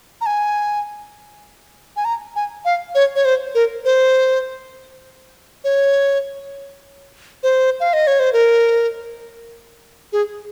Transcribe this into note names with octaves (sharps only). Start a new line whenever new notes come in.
A#5
G#5
G#5
A#5
G#5
F5
C#5
C#5
C5
A#4
C5
C#5
C5
F5
D#5
C#5
C5
A#4
G#4